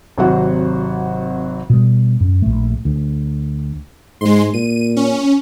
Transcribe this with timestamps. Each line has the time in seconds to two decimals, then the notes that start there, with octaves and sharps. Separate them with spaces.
0.18 G#1 C3 F#3 F#4 C5 F#5
1.70 B2 G3
2.20 F#2
2.42 A#1 A3
2.85 D2
4.21 G#2 G#3 C6
4.54 A#2 D#7
4.96 C#4